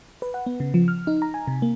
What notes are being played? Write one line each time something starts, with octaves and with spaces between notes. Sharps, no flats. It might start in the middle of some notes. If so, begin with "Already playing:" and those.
B4
F#5
B3
C#3
F3
F6
D#4
A#5
G#5
C3
A#3